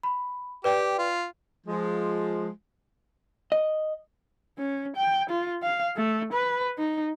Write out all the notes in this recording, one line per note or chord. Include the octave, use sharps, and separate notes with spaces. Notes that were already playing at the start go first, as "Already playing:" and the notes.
B5
G4 B4 D5 G5
F4
F3 G#3
D#5
C#4
G5
F4
F5
A3
B4
D#4